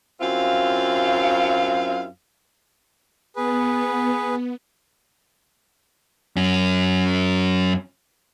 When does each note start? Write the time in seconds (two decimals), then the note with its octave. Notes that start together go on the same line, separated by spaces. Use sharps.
0.21 F#2 C4 E4 F4 F5
3.36 B3 G#4 B4
6.36 F#2 C#4